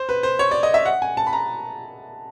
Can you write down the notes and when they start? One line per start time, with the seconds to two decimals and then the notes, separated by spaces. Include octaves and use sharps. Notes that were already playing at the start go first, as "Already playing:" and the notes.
Already playing: C5
0.09 B4
0.23 C5
0.39 C#5
0.51 D5
0.63 D#5
0.74 E5
0.86 F#5
1.02 G#5
1.17 A5
1.27 B5
1.33 A#5